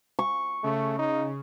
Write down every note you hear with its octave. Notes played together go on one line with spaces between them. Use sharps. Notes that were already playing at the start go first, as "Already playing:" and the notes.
C#6
C#3 A3
D#4